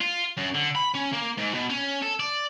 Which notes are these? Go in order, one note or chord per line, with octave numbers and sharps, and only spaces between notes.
F4
F#2
D3
B5
C#4
A#3
G#2
B2
C#4
A4
D5